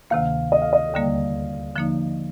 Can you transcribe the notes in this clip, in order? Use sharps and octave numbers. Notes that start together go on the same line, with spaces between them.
D2 C3 D#3 A#3 F5
D#5
F5
D#5
D#2 D3 G3 A#3 D5
D3 F3 A#3 D#4